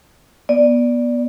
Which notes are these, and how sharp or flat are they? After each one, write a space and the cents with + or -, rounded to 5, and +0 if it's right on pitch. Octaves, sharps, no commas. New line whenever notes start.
B3 -25 D5 +0